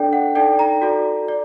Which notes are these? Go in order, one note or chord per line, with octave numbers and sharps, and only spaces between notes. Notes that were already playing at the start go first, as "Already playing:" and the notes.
Already playing: D4 A4 D5 G5
F#5
D#4 A4 D5 G5
A#5
F#4 A4 D5
D5